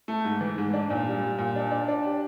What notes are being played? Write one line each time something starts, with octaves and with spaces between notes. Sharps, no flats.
A3
G#2
E3
G#2
D4
A#2
G3
G3
A#2
D4
D4
D4
G4